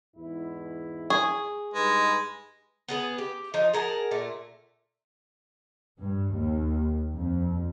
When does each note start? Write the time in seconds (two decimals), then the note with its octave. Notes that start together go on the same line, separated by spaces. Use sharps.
0.16 E2 G#2 E4
1.10 G#4 C#6
1.74 G2 G#3 D#4 B4
2.88 B3 G#4 B4
3.18 G4
3.54 F3 D#4
3.73 G#4 A#4 F#5 A5
4.11 A#2 A3
6.00 G2
6.35 D#2
7.16 F2